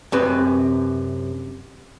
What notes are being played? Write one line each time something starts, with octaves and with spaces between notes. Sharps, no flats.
F#2 C3 B4